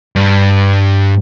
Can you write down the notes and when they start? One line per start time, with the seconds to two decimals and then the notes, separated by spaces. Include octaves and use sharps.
0.16 G2